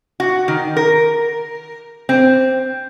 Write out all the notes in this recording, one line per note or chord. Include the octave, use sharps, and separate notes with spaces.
F#4
D#3
A#4
C4